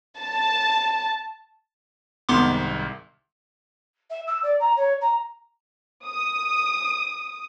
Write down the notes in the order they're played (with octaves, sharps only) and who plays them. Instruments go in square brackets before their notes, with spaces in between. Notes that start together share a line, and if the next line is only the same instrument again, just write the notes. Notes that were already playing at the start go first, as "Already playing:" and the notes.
[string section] A5
[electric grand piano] C2 G#2 D#3 [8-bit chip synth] B3 C6 D6
[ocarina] E5
E6
D5
A#5
C#5
A#5
[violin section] D#6